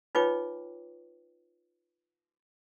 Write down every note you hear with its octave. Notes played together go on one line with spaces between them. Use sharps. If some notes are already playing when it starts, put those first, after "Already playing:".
D#4 F4 B4 C#5 G5 D6